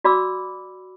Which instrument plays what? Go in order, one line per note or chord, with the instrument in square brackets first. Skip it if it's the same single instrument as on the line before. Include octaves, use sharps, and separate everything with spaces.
[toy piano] F#4 D5 B5 D6 E6